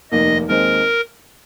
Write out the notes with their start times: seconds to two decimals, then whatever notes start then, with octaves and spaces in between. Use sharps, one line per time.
0.11 F1 D#2 D#3 A#3 D#5
0.49 D#2 D#3 G#3 C4 A#4